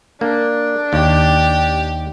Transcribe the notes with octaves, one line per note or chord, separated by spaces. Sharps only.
A#3 D4
D#2 G4